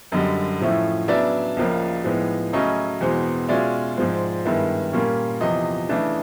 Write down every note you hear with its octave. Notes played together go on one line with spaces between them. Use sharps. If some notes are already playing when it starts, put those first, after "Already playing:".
F#2 D3 G3 D#5
A2 F3 A3 C#4 E4
C#3 F#3 B3 D4 D5 E5
C#2 C#3 F3 A#3
A2 F3 G#3 B3 D#4
C#3 F#3 A3 C#4 D#5
E2 B2 G#3 C4
B2 G#3 C#4 F4 D5 E5
G#2 F3 G#3 C4
G2 D#3 G#3 B3 E4
A#2 G3 A#3 C#4 F4
E2 C3 F3 D#5
C#3 E3 A3 D4